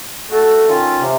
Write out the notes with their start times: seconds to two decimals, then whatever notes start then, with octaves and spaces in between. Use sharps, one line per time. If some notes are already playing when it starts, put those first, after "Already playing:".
0.30 A3 F#4 A4
0.68 D#3 C#4 F4
0.99 C3